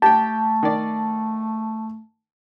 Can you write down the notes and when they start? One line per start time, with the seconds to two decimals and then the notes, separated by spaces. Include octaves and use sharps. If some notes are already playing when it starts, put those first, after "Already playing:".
0.02 A3 G4 G5 A5
0.63 D#3 D5